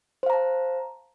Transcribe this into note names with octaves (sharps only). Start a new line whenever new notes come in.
C5 F5 A5 A#5